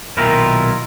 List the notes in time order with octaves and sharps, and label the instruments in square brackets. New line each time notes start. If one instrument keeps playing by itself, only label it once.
[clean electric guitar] B1 A#2 D#3 E4 F4 A#4